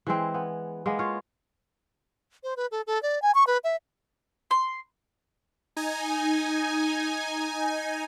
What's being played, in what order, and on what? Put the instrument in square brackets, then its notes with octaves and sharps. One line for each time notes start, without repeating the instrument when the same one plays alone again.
[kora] E3 G#3 C4
B3
G#3 A#3 B3
F4 C#5
[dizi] C5
B4
A4
A4
D5
G#5
C#6
B4
E5
[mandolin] C6
[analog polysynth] D#4 G#5